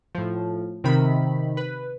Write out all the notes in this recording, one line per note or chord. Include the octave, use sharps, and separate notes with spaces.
A2 F3
C3 D#3 B5
B4